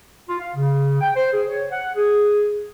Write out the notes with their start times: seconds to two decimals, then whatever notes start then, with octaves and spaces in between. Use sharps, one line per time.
0.29 F4
0.40 F5
0.55 C#3
1.01 G5
1.16 C5
1.33 G#4
1.48 C#5
1.71 F#5
1.95 G#4